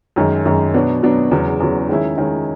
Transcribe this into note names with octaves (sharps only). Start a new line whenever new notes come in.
F#2 D#3 G#3 C#4
F#2 D#3 G#3 C#4
B2 F#3 B3 D4
B2 F#3 B3 D4
E2 C#3 F#3
E2 C#3 F#3
D#3 G#3 C#4 E4
D#3 G#3 C#4 E4